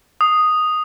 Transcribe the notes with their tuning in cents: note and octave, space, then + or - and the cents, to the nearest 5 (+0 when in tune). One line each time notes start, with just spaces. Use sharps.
D#6 -5